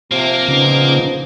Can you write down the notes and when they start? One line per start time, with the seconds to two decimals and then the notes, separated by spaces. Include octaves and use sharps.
0.11 C3 F3 A#3
0.48 A#2 C#3 B3 D#4